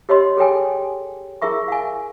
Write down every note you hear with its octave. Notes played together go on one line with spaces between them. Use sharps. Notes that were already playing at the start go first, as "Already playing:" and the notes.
G4 C#5 D#5 C6
G#4 A4 C#5 G5 G#5
E4 G#4 A#4 E5 C#6
F5 G#5